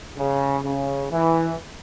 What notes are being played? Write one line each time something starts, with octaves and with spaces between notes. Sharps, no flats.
C#3
C#3
E3